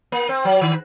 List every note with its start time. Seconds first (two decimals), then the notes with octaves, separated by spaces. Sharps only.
0.12 A#3
0.29 C4
0.45 F#3
0.61 D#3